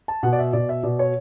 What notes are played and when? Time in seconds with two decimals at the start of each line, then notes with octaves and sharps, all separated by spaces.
0.08 A5
0.23 B2 F#5
0.33 D5
0.39 E5
0.53 B2 D5
0.69 E5
0.83 B2 D5
0.99 C#5